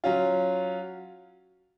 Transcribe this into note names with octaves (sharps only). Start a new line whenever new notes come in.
F#3 C#4 F4